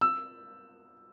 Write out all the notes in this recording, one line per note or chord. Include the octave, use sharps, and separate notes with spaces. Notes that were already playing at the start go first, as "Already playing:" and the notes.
E6